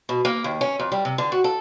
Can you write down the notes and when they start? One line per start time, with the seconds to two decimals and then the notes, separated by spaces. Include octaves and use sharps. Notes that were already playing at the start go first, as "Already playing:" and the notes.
0.09 B2
0.25 A#3
0.44 D#2
0.61 C#4
0.79 F2
0.92 G3
1.05 C3
1.18 D3
1.32 F#4
1.44 A4